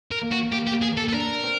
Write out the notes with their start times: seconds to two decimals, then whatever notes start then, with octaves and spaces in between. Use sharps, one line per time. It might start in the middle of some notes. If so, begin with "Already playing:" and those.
0.11 A#4
0.22 A#3
0.31 F#4
0.52 A#3 G4
0.67 G4
0.72 A#3
0.82 G#4
0.92 A#3 A4
1.09 A4
1.12 D4 A#4
1.44 C4